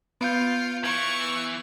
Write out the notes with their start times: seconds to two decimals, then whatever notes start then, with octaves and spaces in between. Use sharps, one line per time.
0.21 B3 F4 G6 C#7 D7
0.84 E3 C#6 G#6 D7